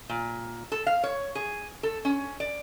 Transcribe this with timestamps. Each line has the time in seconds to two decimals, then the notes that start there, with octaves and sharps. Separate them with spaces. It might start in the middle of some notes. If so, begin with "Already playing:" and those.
0.09 A#2
0.72 A4
0.87 F5
1.04 C#5
1.35 G#4
1.83 A4
2.05 C#4
2.40 D5